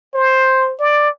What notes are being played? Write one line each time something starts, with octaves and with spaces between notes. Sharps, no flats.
C5
D5